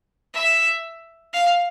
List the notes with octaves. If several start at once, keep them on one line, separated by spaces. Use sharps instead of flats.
E5
F5